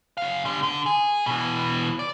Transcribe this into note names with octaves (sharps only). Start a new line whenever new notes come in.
F#2 F5
D3 G3
D3
G#4
B2 E3
D5